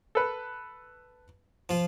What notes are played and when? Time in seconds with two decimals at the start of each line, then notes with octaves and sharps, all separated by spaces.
0.15 A4 B4
1.69 F3 F4